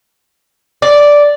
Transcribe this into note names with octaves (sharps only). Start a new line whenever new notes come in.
D5